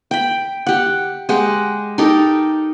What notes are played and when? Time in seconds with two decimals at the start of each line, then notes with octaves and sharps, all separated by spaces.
0.11 G5 B5
0.66 G4 F#5
1.29 G#3 G4 F#5
1.98 D#4 G4 A4 A#4